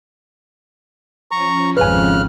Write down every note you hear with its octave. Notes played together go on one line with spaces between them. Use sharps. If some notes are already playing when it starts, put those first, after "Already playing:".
F3 C#4 A#5 C#6
G#1 F2 C#3 B4 G#5 F6 F#6